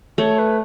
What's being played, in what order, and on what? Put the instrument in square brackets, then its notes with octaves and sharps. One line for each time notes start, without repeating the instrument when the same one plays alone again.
[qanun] A3 [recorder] C#5
[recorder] B4